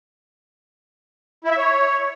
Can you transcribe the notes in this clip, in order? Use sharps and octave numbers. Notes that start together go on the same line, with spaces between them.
E4
E5
C#5